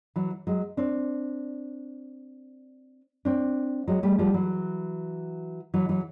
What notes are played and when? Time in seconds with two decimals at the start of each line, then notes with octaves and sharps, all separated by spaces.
0.16 E3 F#3
0.47 F#3 G#3
0.77 C4 D4
3.25 C4 D4
3.87 F#3 G#3
4.03 G3 A3
4.18 F3 G3
4.34 E3 F#3
5.74 E3 F#3
5.89 E3 F#3